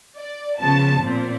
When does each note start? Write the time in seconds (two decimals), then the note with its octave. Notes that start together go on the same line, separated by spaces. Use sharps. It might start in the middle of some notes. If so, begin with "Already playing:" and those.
0.16 D5
0.58 C#3 F3 B3 A5
1.01 A#2 C4